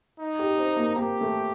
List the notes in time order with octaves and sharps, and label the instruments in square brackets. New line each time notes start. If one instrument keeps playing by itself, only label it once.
[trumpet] D#4
[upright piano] G4
C4
A#3
[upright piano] A#3 [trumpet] G4
[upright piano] A3